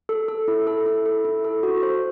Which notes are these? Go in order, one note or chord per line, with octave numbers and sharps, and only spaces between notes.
A4
A4
E4
A4
E4
A4
E4
A4
F#4
C5